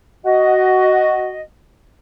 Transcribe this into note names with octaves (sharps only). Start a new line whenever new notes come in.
F#4 D#5